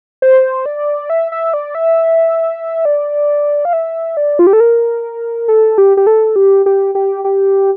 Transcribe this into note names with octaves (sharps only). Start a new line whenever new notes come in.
C5
D5
E5
E5
D5
E5
D5
F5
E5
D5
F4
G4
A4
A#4
A4
G4
G4
A4
G4
G4
G4
G4